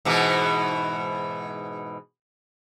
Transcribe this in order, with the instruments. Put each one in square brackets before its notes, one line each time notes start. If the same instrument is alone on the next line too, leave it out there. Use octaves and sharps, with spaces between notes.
[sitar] G#2 B2 E3